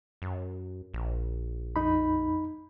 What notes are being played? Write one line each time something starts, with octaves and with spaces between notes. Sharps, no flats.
F#2
A#1
F2 D#4 B5